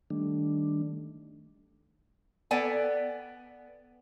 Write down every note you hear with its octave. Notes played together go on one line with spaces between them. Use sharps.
D#3 G3 A3 D4
B3 A4 D5 G5 G#5